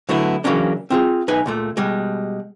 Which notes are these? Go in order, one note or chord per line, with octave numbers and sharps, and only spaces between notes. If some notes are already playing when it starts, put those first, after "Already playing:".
D3 F#3 A3 B3 E4
C#3 E3 F#3 A#3 C#4 D4
C4 F4 G#4
B1 D#4 B4 G#5
C#2 A#2 A3
B2 G3 G#3